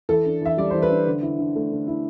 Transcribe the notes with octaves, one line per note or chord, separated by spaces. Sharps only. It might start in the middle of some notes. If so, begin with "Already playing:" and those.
E3 A4
D4
E3 E5
G3 D5
E3 C5
B4
D4
D3
E4
D3
A3
D3
E4